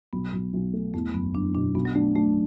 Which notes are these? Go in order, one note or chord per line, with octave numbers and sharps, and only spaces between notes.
B1 B3
B1
B1
A3
E2 A3
F#1 B3
F#1 D4
B2 D4
B1 B3
F#3
A3 D4
A3 D4